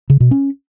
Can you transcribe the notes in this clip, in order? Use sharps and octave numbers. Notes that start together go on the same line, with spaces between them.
C#3
B2
C#4